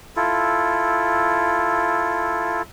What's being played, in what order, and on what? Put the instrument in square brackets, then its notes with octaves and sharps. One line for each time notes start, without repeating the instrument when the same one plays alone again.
[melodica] E4 F4 A4